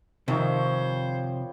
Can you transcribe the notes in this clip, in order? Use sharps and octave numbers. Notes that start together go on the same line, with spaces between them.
F2 C3 D#3 F3 G3 C5 C#5